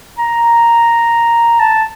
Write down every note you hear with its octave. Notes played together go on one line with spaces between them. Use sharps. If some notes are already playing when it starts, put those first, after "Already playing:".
A#5
A5